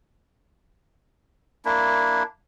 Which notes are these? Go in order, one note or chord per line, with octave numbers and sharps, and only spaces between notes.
A#3 D4 E4